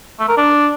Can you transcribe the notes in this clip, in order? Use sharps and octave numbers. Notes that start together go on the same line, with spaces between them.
A3
A#4
D4